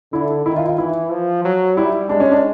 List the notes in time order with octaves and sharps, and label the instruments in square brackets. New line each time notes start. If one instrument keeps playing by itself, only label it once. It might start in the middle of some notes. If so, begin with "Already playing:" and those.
[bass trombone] D3 [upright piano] E4
[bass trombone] D#3 [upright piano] E4
[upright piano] F4
F4
[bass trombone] E3 [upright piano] E4
[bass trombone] F3
F#3
[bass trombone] G3 [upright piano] E4
[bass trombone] G#3 [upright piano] D4
[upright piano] C#4
D4